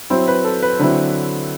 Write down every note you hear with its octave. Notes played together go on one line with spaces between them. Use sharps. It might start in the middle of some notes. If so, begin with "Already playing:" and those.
F#3 C4 E4 C5
B4
A4
B4
D3 F#3 C4 E4 B4